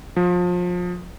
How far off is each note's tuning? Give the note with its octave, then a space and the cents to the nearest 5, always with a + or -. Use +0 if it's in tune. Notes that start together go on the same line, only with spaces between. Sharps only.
F3 +30